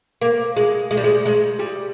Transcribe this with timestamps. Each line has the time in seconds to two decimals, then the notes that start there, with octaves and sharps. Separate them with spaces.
0.22 A#3
0.56 G#3
0.91 G#3
0.97 G3
1.04 G#3
1.26 G#3
1.59 G3